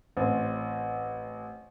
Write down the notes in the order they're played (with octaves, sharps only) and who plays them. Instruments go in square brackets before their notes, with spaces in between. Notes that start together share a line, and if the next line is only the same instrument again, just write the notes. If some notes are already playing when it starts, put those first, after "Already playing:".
[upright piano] A1 C4